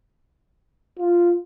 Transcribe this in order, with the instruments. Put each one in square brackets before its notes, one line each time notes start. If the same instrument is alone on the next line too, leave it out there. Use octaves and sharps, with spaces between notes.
[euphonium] F4